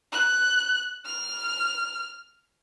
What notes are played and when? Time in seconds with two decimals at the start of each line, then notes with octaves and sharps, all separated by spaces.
0.12 F#6
1.06 F6